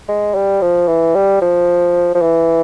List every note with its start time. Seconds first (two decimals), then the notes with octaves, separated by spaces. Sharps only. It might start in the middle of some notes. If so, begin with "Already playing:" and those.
0.08 G#3
0.35 G3
0.61 F3
0.88 E3
1.15 G3
1.42 F3
2.15 F3
2.22 E3